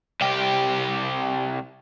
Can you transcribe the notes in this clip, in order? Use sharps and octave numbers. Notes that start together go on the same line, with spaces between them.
C2 G4